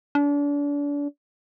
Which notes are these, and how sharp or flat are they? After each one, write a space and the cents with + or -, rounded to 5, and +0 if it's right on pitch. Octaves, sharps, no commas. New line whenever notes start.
D4 -35